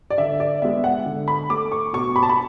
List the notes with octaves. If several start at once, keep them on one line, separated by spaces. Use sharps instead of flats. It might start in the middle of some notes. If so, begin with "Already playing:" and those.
D5
D3 E5
D5
G#3 B3 E5
F#5
D3
B5
A3 D6
C#6
B2 C#6
B5
A5
B5